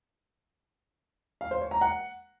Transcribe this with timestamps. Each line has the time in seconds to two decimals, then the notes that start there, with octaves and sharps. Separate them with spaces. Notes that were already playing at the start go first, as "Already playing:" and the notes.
1.41 F5
1.51 C5
1.61 C#5
1.71 A#5
1.81 F#5